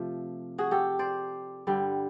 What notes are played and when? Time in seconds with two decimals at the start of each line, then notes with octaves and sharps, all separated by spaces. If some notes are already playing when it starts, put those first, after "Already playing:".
Already playing: C3 F3 A3 F4
0.58 F#4 G#4
0.71 G4 A4
0.99 C5 D5
1.67 G2 D3 G3